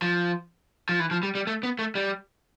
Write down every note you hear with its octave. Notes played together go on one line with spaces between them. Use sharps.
F3
F3
E3
F3
G3
G3
A3
B3
A3
G3